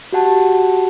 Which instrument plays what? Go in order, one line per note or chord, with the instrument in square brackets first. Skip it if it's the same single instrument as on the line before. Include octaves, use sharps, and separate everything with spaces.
[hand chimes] F#4 G4 F#5 A5